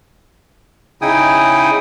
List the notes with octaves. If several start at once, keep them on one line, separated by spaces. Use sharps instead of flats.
C#3 D#4 E4 G5 G#5 D#6